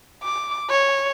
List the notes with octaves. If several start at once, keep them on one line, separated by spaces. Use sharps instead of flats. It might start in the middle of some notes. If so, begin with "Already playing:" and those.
D6
C#5